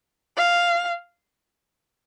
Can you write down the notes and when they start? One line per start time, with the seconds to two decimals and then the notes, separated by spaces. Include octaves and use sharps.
0.37 F5